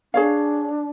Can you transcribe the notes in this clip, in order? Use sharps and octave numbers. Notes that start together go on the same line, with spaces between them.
D4 G#4 C#5 F5